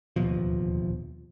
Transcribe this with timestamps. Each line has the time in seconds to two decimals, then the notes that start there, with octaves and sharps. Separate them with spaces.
0.16 D1 D#2 B2 F3